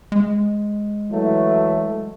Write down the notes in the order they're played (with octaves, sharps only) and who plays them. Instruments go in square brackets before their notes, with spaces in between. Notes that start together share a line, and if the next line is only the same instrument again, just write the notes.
[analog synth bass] G#3
[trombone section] E3 F#3 A3